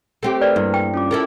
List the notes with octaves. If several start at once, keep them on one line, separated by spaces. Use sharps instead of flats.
A3 C4 G4
A#4 B4 D5 F6
G2 A#3 E4
G5
C#4 F4 D6
E4 A4 A#4